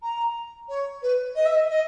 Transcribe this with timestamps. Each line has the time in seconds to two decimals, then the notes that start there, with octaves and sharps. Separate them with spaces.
0.02 A#5
0.68 C#5
1.02 B4
1.35 D#5
1.45 E5
1.56 D#5
1.69 D#5